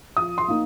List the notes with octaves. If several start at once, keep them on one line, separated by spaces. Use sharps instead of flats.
F3 D#6
C6
A#3 D#4